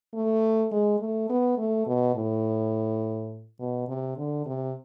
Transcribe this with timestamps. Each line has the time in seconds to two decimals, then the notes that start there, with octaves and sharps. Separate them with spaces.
0.14 A3
0.72 G#3
1.01 A3
1.30 B3
1.58 A3
1.87 B2
2.15 A2
3.60 B2
3.88 C3
4.17 D3
4.46 C3